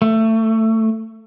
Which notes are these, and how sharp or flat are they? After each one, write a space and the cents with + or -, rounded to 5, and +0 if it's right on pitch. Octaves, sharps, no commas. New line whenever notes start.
A3 +20